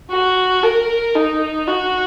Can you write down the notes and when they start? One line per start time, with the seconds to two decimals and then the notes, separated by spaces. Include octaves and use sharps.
0.11 F#4
0.63 A#4
1.15 D#4
1.67 F#4